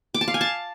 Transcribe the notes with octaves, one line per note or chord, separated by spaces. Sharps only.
D6
A5
F5
G#5
A5